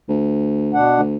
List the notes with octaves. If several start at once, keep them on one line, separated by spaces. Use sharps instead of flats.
D2
B2 D4 F#5
D2